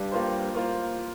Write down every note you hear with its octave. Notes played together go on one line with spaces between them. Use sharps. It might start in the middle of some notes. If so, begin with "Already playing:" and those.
Already playing: G2
A#3 F4 C5
A#3 F4 C5